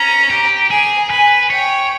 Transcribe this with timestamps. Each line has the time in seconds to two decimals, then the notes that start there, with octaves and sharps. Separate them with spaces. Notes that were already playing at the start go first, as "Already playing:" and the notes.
Already playing: C#4 A#5
0.30 G4
0.70 G#4 G#5
1.10 B4 G#5
1.50 C#5 G5